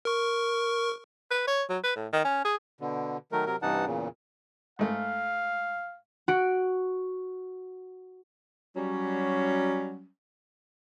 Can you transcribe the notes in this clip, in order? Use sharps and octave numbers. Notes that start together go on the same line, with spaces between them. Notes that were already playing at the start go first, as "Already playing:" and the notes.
A#4 C#6
B4
C#5
F#3
B4
A2
D#3
C#4
G#4
B2 D3
D#3 F#3 A3 A#4
C3 F#3 A#4
G2 C3 E3 D#4 F#5 A5
E2 A#2 C#3
G#2 A3 F5
F#4 D7
F#3 G3 C#4